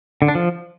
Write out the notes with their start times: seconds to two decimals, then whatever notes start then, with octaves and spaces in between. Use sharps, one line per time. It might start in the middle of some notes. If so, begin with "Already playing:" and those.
0.22 D3
0.28 D4
0.35 F3